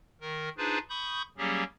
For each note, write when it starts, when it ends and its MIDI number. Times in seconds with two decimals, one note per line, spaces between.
0.21 0.49 51
0.21 0.49 70
0.58 0.78 62
0.58 0.78 63
0.58 0.78 65
0.58 0.78 68
0.58 0.78 71
0.58 0.78 72
0.89 1.22 83
0.89 1.22 85
0.89 1.22 87
0.89 1.22 91
1.38 1.63 54
1.38 1.63 55
1.38 1.63 58
1.38 1.63 61
1.38 1.63 67
1.38 1.63 68